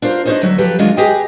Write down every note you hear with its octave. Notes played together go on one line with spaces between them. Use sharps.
D4 F4 A#4 C5
D4 D#4 G4 C5 C#5 D#5
D2 F#3 D#5 E5
F3 F#3 G4 A4 B4
F2 D#3 F#3 G#3 D4 F4
G4 G#4 B4 D#5 G5